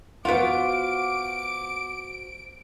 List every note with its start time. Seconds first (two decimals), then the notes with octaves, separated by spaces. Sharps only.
0.25 B3 F4 F#4 C5 F#5 D6 D7